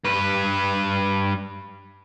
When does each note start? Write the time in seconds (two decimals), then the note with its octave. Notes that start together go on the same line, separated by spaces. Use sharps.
0.05 G2 B4